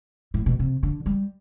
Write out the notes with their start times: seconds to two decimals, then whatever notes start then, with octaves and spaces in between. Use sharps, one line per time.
0.34 A2
0.46 B2
0.59 C3
0.83 D3
1.06 G3